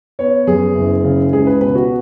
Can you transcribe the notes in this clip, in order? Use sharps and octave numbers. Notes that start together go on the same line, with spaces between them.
B3 C#5
F#2 G#4
F#1
C#3
C#2 G#4
B4
B2 B4
F#4